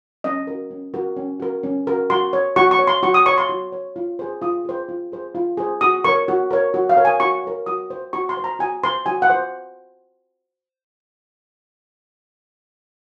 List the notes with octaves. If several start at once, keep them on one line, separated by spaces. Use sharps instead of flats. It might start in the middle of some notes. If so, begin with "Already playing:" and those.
C#4 D#5
F#4 A#4
C#4
F#4 A#4
C#4
F#4 A#4
C#4
F#4 A#4
F#4 C6
C#5
F#4 C#6
C#6
C#5
C6
F#4 C#6
D#6
C#5 C#6
C6
F#4
C#5
F4
G#4 C5
F4 D#6
G#4 C5
F4
G#4 C5
F4
G#4 C5
F#4 D#6
A#4 C#5 C#6
F#4
A#4 C#5
F#4
F5
A#4 C#5
G#5
F#4 C#6
A#4 C#5
F#4 D#6
C5
F#4 C#6
C6
C5
A#5
F#4 G#5
C5 C6
F#4 G#5
F#5
C5